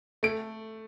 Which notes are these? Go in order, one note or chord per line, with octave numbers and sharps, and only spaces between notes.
A3 D7